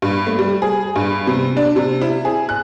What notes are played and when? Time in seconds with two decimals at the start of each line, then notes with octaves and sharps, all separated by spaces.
0.02 G2
0.27 A3
0.39 G3
0.62 G#4
0.96 G2
1.27 C3
1.57 D4
1.76 C3
2.02 E4
2.25 G#4
2.49 F#6